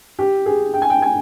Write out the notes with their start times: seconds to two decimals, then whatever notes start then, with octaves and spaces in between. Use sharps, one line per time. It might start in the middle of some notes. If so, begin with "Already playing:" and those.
0.19 G4
0.46 G#4
0.74 G5
0.82 G#5
0.90 G5
1.02 G#5